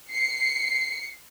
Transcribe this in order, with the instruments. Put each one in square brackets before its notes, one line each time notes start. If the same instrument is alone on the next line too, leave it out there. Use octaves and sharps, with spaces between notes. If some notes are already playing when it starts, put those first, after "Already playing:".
[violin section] C7 C#7